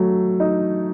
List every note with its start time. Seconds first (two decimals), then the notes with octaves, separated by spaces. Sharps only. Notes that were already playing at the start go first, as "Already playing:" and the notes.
Already playing: F#3 A3
0.40 D#4